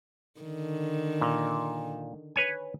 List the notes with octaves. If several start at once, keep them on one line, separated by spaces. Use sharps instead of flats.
D3 D#3
A#2
B4 C#5 G#5